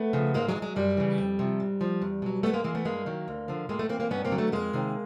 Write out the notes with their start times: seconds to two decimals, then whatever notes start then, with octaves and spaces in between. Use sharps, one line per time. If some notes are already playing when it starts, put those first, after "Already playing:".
Already playing: A3 B3
0.13 C#3 F3
0.34 G#2 G#3 A#3
0.48 F#3 G#3
0.56 E3
0.62 F#3 G#3
0.76 F#2 G3
0.97 C#3 E3
1.18 F2
1.39 C3 F3
1.60 G#2
1.81 F3
2.02 E2
2.22 B2 F#3
2.43 G#2 A3 B3
2.53 G#3 A#3
2.64 E3 G#3 A#3
2.75 A3 B3
2.85 G2 G#3 A#3
3.06 D#3 F#3
3.28 D2
3.48 D3 F3
3.69 A2 G#3 A#3
3.79 A3 B3
3.89 E3 A#3 C4
4.00 A#3 C4
4.10 G2 B3 C#4
4.25 A#3 C4
4.31 D3 F#3
4.38 A3 B3
4.52 F2 G#3 A#3
4.73 C3 D#3